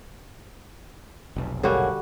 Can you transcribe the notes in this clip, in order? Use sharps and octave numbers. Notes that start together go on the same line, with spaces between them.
F1 B1
D3 G3 A#3 F#4 G#4 C#5